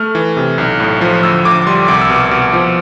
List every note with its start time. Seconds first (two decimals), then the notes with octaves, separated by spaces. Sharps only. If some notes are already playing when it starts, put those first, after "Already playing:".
Already playing: A3 F6
0.15 E3
0.37 C3
0.58 B1
0.80 A2
1.01 F3
1.23 D2 E6
1.45 D2 D6
1.67 G3 C6
1.88 C2 D6
2.01 E6
2.10 B2
2.15 D6
2.31 B2
2.53 F3